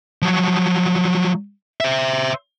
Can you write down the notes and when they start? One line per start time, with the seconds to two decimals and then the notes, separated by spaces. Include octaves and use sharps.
0.22 F3 F#3
1.80 C5 E5